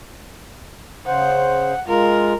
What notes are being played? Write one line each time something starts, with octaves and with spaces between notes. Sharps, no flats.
C#3 C5 F#5
G#3 F4 A#4